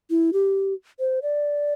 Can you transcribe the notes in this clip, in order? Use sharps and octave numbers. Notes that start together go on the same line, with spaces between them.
E4
G4
C5
D5